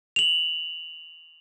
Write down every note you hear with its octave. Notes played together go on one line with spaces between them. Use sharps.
F7 F#7